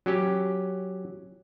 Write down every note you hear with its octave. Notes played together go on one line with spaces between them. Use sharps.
F#3 C#4 G4